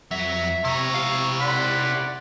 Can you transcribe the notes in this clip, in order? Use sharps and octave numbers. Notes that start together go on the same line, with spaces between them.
F2 F#3 E5
C3 E4 G5 A#5 C#6
F5
D5 F#5 B5 C6